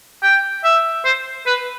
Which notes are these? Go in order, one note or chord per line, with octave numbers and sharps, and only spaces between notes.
G5
E5
C5
B4